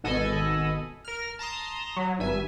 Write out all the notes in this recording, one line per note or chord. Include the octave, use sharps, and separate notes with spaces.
G#1 B2 A4 D#5 G#5 B5
A#4 F6
A5 A#5 C6 D#6
F#3
G#1 G2 E5 G#5